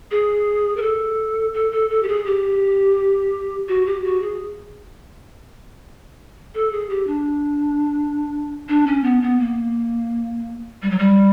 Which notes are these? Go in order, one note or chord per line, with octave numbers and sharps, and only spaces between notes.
G#4
A#4
A4
A4
A4
A4
G4
G#4
G4
F#4
G4
F#4
G#4
A4
G#4
G4
D4
D4
C#4
B3
B3
A#3
G3
F#3
G3